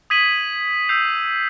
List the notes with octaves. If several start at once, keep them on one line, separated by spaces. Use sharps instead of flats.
D#6 G#6 B6 D#7 F#7
E6 G6 C7 F7